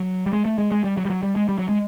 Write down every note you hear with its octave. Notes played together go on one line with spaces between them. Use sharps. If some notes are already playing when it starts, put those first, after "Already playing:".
Already playing: F#3
G3
G#3
A3
G#3
G#3
G3
F#3
G3
F#3
G3
G#3
G3
F#3
G#3